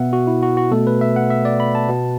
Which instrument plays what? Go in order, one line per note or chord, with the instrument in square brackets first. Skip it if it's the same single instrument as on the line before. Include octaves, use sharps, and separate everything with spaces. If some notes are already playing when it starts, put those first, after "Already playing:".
Already playing: [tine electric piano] B2 B3 E5 F#5
F#4
E4
F#4
F#4
B2 A3 A4
B4
E5
F#5
E5
D5
B5
A5
B2 B3